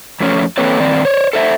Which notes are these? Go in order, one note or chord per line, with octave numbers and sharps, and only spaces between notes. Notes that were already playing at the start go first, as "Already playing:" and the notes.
F2 A3 C#4
E3 A#3 C4 A4 B4 C#5
G2 D#3 C4 D5
C5 C#5
A4 C5 E5